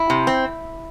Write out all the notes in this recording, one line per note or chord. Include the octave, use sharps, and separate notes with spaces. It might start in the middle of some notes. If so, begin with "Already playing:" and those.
Already playing: E4
C3
C4